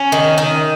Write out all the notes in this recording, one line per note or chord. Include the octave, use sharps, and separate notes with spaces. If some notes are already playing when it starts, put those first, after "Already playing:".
Already playing: C#4
D#3
D#3